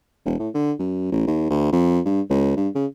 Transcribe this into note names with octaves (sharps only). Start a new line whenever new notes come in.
E1
A2
D3
F#2
A1
D#2
D2
F2
G2
C#2
G2
C#3